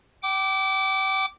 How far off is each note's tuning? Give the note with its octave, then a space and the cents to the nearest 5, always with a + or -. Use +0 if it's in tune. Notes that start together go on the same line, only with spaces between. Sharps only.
G5 -35 D6 +0